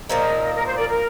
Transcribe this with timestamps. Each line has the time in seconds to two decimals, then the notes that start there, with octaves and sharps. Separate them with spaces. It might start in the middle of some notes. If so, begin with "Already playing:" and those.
0.09 A#2 F3 G#3 D#4 A#4
0.55 A#4
0.66 C5
0.77 A#4 D5
0.88 A#4